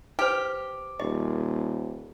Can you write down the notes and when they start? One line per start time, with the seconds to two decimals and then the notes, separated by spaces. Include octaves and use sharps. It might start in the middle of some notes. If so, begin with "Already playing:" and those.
0.19 G4 B4 C5
1.00 D#1 D#5